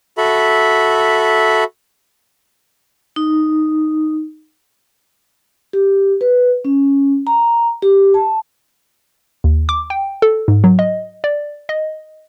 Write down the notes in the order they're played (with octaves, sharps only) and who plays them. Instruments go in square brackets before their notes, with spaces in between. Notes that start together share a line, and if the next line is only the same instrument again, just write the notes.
[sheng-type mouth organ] F#4 A4 E5 B5
[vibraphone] D#4
G4
B4
C#4
A#5
G4
A5
[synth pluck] D#2
D6
G5
A4
G#2
F#3
D#5
D5
D#5